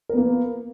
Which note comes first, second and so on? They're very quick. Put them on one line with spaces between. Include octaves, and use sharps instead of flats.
A#4 B3 A#3